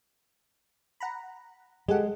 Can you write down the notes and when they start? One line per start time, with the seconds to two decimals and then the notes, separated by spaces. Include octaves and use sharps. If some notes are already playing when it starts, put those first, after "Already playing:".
1.00 F#5 A#5 B5
1.88 G#3 G4 A4 F#5